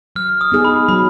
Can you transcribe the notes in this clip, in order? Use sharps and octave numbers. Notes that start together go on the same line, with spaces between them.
F#3 F6
D#6
B3 D#4 G#4
B5
F#3 B5